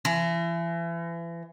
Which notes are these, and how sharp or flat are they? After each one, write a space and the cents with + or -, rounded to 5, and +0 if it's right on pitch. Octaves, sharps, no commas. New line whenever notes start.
E3 +35